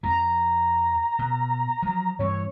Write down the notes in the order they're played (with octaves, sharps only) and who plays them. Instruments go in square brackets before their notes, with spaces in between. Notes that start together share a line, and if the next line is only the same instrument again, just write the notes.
[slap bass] F2 F3 [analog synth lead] A#5
[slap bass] B2
F3 F#3
[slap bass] G2 E3 C4 [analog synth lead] C#5